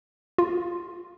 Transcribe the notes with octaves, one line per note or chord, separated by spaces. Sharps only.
F4